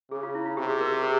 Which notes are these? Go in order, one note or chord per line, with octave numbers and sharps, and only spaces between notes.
C#3 G#4
F4
E4
F4
C3 G4
G#4
A#4
G#4
G4